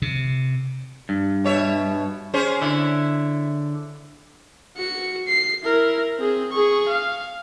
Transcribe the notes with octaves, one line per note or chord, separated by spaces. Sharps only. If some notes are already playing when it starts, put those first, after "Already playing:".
C3
G2
B2 C#5 E5
C#4 G#4 C5
D3 E4
F#4 C#7
C7
E4 A#4
C4 G#4
G#4 C#6
F5